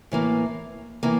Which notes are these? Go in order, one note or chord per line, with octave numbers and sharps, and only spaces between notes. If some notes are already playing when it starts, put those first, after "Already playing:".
A2 E3 A#3
A2 E3 A#3